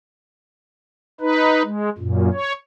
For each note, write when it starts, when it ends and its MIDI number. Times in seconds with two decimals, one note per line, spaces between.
1.21 1.63 63
1.21 1.63 71
1.64 1.90 56
1.98 2.29 42
1.98 2.29 46
2.33 2.53 73